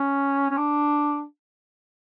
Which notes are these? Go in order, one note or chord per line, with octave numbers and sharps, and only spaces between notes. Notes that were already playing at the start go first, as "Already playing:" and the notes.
Already playing: C#4
C#4
D4